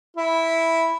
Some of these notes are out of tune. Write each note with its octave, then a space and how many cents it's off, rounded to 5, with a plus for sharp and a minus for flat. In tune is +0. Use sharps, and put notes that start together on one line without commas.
E4 -5